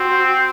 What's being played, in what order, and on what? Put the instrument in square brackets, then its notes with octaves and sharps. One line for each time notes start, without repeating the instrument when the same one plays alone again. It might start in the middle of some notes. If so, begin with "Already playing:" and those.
Already playing: [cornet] C4 [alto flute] F#4